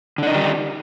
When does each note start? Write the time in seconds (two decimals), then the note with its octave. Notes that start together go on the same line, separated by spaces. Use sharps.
0.18 D3
0.23 D4
0.27 D#4
0.31 D#3
0.36 G3